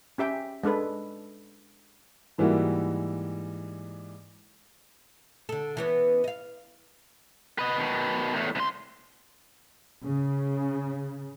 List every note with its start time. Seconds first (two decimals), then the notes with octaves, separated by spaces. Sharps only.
0.18 C#4 G4 E5 G5
0.64 G#3 D4 A4 B4
2.38 G#2 E3 G3 A#3 E4 F#4
5.49 D3 A4
5.77 E3 B3 C#4
6.24 D#5 F5
7.59 B4 D#5
7.78 B2 D#3
8.35 E2 A2
8.55 C2 C6
10.04 C#3